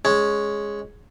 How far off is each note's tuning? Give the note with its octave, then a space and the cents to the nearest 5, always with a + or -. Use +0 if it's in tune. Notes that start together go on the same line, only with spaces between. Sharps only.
G#3 +0 C#4 +0